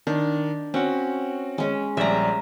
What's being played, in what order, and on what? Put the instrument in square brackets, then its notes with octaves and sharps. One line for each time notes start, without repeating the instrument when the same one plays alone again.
[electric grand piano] D#3 [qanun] D4
[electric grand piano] C4 F#4 F#5 [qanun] C#4
[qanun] G#3 C#4
[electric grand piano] A#1 G3 D5 [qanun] E5 A#5